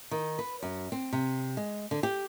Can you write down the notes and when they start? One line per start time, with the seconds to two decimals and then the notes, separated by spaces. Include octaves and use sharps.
0.11 D#3
0.39 B4
0.63 F#2
0.92 C4
1.13 C3
1.57 G#3
1.91 D3
2.03 G4